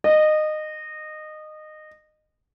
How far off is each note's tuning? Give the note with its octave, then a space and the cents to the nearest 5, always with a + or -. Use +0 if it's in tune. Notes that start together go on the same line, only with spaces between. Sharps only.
D#5 -20